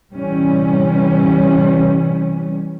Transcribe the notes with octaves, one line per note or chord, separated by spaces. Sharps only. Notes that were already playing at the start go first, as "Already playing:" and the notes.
C3 E3 G3 C#4